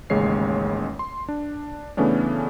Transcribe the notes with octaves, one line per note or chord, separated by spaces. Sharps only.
A1 D#2 C#3 G#3 C#5 C7
C6
D4
C#3 E3 A3 B3 C#4 D4